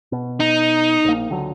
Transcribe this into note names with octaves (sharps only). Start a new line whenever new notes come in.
B2
D#4
A#1 A#3
C#2 D3 F#3